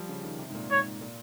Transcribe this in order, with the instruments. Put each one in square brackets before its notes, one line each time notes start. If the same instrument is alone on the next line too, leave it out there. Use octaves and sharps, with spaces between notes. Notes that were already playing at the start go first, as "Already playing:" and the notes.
Already playing: [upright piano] F3 G3
C#3
D#3
C3
G#2
A#2
[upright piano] G#2 [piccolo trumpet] C#5
[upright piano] A#2